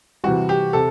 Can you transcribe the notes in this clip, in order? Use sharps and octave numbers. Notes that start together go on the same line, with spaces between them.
C3 E3 G3 F#4
G4
C3 A4